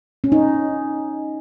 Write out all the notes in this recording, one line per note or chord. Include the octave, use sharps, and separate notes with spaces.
C#4
D#4